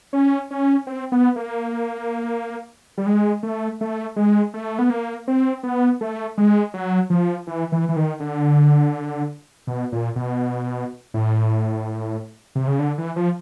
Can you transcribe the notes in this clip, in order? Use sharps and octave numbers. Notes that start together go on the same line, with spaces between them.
C#4
C#4
C4
B3
A#3
G3
G#3
A3
A3
G#3
A3
B3
A#3
C4
B3
A3
G#3
F#3
F3
E3
E3
E3
D#3
D3
B2
A#2
B2
A2
C3
C#3
D3
E3
F3